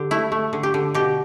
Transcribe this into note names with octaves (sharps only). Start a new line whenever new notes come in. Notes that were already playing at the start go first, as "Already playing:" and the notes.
Already playing: D3 G4
A3 E4
A3
D3
G4
D3
B2 G4